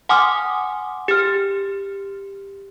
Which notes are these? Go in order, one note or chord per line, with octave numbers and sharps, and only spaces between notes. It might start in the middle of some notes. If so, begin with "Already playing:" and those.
F#5 G#5 C6 D6 D#6 F6
G4 F6